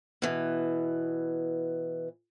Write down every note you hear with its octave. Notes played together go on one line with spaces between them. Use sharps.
B2 E3